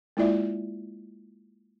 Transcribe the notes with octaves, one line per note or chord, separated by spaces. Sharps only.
G#3 A#3 E4 F4 D5 E5